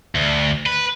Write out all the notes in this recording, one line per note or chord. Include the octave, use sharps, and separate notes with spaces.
D2
B4